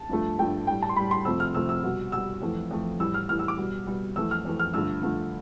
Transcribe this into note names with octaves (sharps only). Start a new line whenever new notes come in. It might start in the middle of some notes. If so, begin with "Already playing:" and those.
Already playing: A5
G2 F3 A3
G2 F3 A3 G5
A2 G3 G5
A5
C6
A2 G3 B5
C6
F2 C3 F3 A3 E6
F6
F2 C3 F3 A3 E6
E6
B2 G3
B2 G3 E6
F2 E3 A3
F2 E3 A3
A2 E3 G3 E6
F6
A2 E3 G3 F6
E6
D6
B2 G3
B2 G3
F2 E3 A3 E6
F6
F2 E3 A3
F6
G2 D3 F3 A3 E6
G2 D3 F3 A3